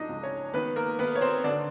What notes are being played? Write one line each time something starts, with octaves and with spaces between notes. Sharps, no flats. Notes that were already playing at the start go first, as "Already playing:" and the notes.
Already playing: F3 D4 D#4 D#5
C#2
C#4 C#5
D#3 B3 B4
A#3 A#4
D#3 B3 B4
C#5
C4 C5
D3 D4 D5